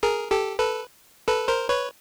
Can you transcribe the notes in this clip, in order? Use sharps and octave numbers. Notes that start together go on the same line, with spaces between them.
G#4 A#4
G4 A4
A4 B4
A4 B4
A#4 C5
B4 C#5